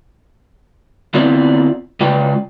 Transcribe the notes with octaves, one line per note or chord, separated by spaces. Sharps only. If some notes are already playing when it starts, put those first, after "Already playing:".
D3 B3 C4 E4 F4 D5
C#3 G#3 F4 B4 D5 G5